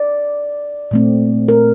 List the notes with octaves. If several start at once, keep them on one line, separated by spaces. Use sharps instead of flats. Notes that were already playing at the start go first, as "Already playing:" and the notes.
Already playing: D5
A#2 A3 C4
A#4